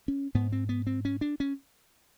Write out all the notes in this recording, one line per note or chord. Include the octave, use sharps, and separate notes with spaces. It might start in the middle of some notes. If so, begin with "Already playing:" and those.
C#4
G#2 B3
C4
B3
C4
C#4
D4
C#4